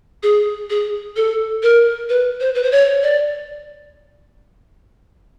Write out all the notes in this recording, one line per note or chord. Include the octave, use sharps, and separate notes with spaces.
G#4
G#4
A4
A#4
B4
C5
B4
C5
C#5
D5